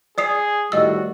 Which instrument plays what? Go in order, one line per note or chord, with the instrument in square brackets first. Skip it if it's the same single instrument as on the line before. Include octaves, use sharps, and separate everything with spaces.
[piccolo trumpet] G#4 [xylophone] D5 D#6 C7
[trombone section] A2 D#3 G3 [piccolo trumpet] F#4 [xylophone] D#5 E6